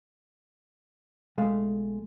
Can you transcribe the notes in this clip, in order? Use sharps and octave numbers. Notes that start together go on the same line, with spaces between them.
B1 G#3 A3 F5